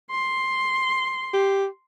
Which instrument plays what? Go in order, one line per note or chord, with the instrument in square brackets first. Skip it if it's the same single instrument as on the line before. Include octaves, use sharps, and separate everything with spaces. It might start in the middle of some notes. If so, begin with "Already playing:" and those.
[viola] C6
[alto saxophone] G4